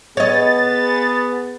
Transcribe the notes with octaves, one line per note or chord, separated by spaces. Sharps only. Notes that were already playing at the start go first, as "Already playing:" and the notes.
B3 G#4 C#5 D#5 A6